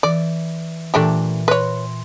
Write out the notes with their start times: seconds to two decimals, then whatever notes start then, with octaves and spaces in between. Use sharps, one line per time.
0.03 E3 D5
0.94 A#2 E3 A3 D4 G4 A#5
1.48 B4 C#5 C6 A#6